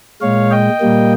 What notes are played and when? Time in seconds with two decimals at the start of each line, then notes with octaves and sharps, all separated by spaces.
0.21 A#2 G#3 C#5 F5
0.51 D#5 G5
0.81 A#2 G3 A#3